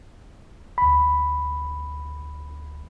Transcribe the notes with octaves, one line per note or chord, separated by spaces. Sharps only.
D2 B5